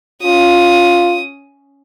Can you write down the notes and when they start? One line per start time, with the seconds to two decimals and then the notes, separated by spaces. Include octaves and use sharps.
0.23 C#4 F4 D#6